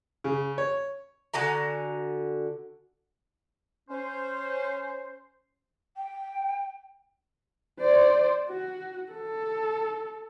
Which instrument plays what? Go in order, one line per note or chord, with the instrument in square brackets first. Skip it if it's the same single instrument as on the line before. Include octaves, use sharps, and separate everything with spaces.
[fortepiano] C#3
C#5
[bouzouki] D3 F#4 G#5 A#5
[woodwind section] C#4 C5
[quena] G5
[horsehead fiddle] C5 D5
F#4
A4